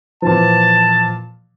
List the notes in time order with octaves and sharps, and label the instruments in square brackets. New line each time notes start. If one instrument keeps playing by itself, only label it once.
[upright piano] A#2 E3 F3 [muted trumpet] A5